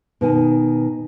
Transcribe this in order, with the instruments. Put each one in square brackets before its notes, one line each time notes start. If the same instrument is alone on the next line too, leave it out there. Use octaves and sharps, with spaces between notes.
[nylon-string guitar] B2 D#3 G#5